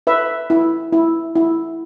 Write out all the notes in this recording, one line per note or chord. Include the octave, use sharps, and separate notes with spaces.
B4 E5
E4
E4
E4